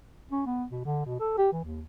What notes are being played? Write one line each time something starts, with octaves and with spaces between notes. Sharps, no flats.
C#4
B3
B2
D3
B2
A4
G4
E3
D#2